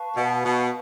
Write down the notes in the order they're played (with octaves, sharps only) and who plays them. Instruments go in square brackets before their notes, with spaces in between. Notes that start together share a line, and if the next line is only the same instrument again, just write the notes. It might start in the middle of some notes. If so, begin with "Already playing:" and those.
Already playing: [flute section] B4 F5 A5 C#6
[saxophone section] B2
B2